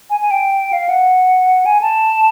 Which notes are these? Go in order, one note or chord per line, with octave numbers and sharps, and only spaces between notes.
G#5
G#5
G5
F5
F#5
G#5
A5